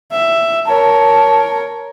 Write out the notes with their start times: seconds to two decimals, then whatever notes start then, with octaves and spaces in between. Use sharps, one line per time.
0.12 E5
0.67 A#4 C#5 A5